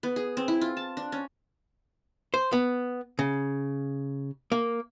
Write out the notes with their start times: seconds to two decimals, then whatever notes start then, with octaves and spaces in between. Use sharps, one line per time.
0.03 B3
0.16 G#4
0.37 C4
0.48 E4
0.61 F4
0.77 A5
0.97 D4
1.12 C#4
2.34 C5
2.53 B3
3.19 C#3
4.52 A#3